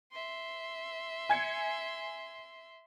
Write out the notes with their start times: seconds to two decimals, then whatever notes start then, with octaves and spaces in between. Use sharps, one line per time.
0.13 E5 C6
1.29 G#5 G#6 C#7